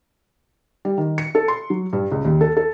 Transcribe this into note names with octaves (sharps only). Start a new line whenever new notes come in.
G3
D#3
C#7
A4
C6
F#3
G2
C#2
D#2
A4
A4